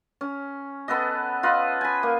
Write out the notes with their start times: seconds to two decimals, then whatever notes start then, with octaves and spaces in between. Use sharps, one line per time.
0.21 C#4
0.88 B3 A4 B4 D#5
1.43 F4 B4 D#5
1.81 G#5 B5
2.03 A#3